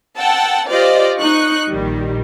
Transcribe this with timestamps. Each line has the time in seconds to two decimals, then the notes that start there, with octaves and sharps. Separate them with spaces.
0.18 F#5 G5 A5 E6
0.69 F4 G4 C5 D5 D#5 F5
1.19 D#4 C#6 F#6
1.70 A#1 D#3 G3